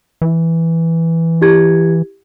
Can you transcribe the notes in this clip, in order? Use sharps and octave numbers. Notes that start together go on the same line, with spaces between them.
E3
E4 G4 G#6